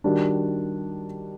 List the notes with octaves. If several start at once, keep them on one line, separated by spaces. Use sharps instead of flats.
D#3 G3 D4 F#4